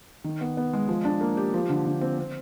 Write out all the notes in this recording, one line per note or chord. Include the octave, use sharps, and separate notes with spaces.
D#3
B3
B3
G#3
F3
D4
A#3
G4
F3
D3
D3
C4
C4